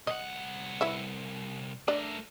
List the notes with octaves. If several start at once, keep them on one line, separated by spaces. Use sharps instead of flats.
C2 D#5 F#5
E4 B4 E5
A3 D4 A#4 D5